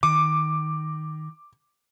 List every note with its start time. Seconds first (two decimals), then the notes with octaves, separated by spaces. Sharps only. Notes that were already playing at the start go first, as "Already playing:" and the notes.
0.03 D#3 D6